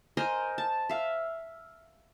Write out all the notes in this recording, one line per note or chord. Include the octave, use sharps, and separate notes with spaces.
A#4 C5 D#5 G#5
A5
E5 F5